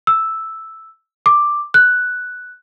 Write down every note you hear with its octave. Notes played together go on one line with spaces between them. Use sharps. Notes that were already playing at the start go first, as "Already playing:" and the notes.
E6
D6
F#6